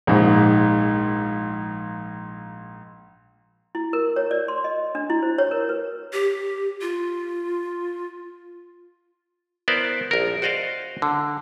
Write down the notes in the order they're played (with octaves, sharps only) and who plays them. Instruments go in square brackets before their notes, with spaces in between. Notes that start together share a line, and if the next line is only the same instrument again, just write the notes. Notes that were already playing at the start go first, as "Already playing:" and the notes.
[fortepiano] A#1 G#2
[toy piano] E4
A#4
C#5
D5
C6
D#5
D4
E4
C5
C#5
A#4
B4
[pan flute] G4
F4
[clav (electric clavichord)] B3 E4 A#4 C5 D5
A#1 A#4
F#4 C5 D5 D#5 F5
D3